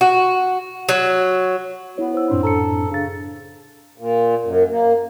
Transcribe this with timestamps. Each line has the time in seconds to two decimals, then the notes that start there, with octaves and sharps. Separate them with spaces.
0.01 F#4
0.89 F#3
1.98 B3 E4 C#5
2.14 C5 E6
2.30 F#2 A2 C4 D4
2.43 A4 A#5 E6 C#7
2.91 C#3 D4 A6
3.98 A#2
4.44 F#2
4.70 A#3